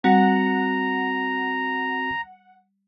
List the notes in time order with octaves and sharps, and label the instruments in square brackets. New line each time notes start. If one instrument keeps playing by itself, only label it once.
[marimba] G3 [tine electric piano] C4 F#4 [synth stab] F#5 [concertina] A#5